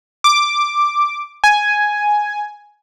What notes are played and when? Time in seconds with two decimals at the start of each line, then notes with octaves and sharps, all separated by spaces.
0.24 D6
1.44 G#5